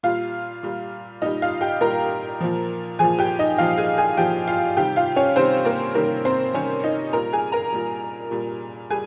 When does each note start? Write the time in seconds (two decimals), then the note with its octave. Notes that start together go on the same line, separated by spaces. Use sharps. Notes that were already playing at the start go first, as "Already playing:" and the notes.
0.03 A#2 G3 F4 F5
0.63 A#2 G3
1.22 A#2 G3 D#4 D#5
1.42 F4 F5
1.61 G4 G5
1.81 A#2 G3 A#4 A#5
2.41 A#2 F3
2.99 A#2 F3 G#4 G#5
3.19 G4 G5
3.39 D#4 D#5
3.58 A#2 F3 F4 F5
3.78 G#4 G#5
3.98 G#4 G#5
4.17 A#2 F3 G4 G5
4.47 F4 F5
4.77 C3 D#3 G3 G4 G5
4.96 F4 F5
5.16 C#4 C#5
5.35 C3 D#3 G3 C4 C5
5.65 A#3 A#4
5.95 C3 D#3 G3 A#3 A#4
6.25 C4 C5
6.54 C3 D#3 G3 C#4 C#5
6.83 D#4 D#5
7.13 A#2 G3 A#4 A#5
7.33 G#4 G#5
7.52 A#4 A#5
7.72 A#2 G3
8.31 A#2 G3
8.90 G3 G#4 G#5